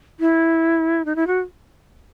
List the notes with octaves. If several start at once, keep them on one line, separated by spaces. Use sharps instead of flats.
E4
D#4
E4
F#4